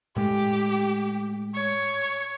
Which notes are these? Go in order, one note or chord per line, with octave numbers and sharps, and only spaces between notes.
A2 G#3 G4
C#5